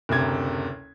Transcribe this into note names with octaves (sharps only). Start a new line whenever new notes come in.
F#1 D2 C3 G#6